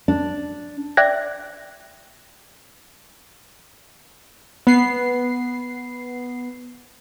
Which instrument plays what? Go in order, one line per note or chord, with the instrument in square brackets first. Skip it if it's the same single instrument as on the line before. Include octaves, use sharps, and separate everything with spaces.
[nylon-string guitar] D4
[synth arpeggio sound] D5 E5 G5 F#6 G#6 A#6
[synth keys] B3 C7